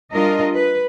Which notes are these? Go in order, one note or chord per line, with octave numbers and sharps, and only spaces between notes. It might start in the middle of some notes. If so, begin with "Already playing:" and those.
G3 D4 F4 A#4 D#5
B4